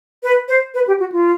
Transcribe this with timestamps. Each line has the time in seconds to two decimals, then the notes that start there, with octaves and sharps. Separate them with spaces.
0.23 B4
0.48 C5
0.74 B4
0.87 G4
1.00 F#4
1.12 F4